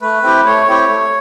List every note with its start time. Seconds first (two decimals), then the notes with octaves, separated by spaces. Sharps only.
0.02 A3 B4
0.23 C4 E4 G4
0.45 A3 C#5
0.68 C4 E4 G4
0.88 A3